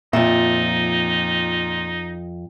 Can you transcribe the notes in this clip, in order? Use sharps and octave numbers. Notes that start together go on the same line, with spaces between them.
F2 A#2 F3 D#4 E5